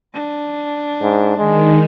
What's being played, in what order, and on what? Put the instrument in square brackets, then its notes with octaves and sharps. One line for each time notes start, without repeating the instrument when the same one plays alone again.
[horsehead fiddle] D4
[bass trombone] G#2
[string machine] D#3 [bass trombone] G#3